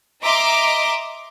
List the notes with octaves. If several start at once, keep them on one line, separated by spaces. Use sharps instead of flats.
D#5 E5 A#5 C6 D6